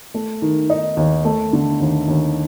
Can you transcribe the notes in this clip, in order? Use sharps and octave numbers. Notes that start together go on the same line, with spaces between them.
A3
D#3
D#4
D#2
A3
D3
D#2
D#2